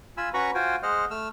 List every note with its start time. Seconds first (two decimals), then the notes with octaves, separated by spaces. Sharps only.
0.17 F4 G#5 B5 E6
0.34 C#4 F#4 B4 A#5 B5 C#6
0.55 F4 F#4 C5 G5 G#5
0.83 G#3 C5 D#5 F#5 F6
1.11 A3 E6 F6